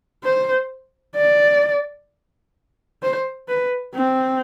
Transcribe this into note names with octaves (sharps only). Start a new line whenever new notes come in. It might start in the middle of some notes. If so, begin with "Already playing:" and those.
C5
D5
C5
B4
C4